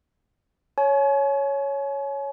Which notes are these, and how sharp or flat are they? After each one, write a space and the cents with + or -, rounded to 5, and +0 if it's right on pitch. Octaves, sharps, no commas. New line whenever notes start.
C#5 +0 G#5 +40